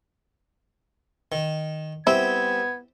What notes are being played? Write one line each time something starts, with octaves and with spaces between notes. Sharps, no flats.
D#3
G3 B3 C4 E4 G#6